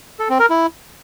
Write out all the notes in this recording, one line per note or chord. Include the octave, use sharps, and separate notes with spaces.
A4
C4
A#4
E4